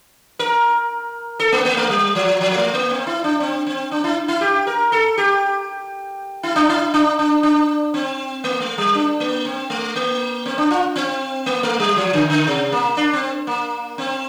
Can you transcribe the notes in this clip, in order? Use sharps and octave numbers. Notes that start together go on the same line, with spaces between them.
A#4
A4
A#3
A#3
A3
G3
F3
F3
A#3
A3
A#3
C4
E4
D4
C4
C4
D4
E4
E4
G4
A#4
A4
G4
E4
D4
E4
D4
D4
D4
C4
A#3
A3
G3
D4
A#3
C4
A3
A#3
C4
D4
F4
C4
A#3
A3
G3
F3
D3
D3
C3
A#3
D4
C4
A#3
C4